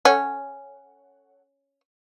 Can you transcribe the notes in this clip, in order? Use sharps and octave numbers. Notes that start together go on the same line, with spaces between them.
C#4 A4 C#5 F#5